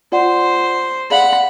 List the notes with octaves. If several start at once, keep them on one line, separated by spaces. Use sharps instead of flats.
F4 C5 D5 F#5
G#4 D5 F5 F#5 B5